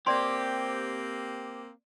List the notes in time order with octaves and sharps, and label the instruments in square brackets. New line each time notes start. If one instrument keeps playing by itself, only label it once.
[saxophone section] A#3 C4 [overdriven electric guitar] G4 [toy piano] D5 C6